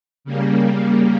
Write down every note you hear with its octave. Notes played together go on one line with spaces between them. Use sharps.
C#3 G3 A#3